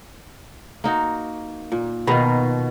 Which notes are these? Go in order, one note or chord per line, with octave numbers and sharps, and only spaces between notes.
A#3 D#4 F#4
A#2
B2 D#3 F4